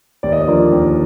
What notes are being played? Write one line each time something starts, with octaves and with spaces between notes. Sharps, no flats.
D#2 D5
D#5
D5
D3 F3 A#3 F4
D#2